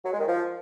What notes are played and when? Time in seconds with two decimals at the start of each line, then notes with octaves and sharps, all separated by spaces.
0.05 F#3
0.12 G#3
0.20 D#3
0.27 F3